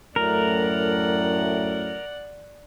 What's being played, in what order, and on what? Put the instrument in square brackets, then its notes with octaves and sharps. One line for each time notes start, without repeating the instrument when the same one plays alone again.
[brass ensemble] F#2 A2 A3 [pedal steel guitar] A#4 [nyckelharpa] D5 F#5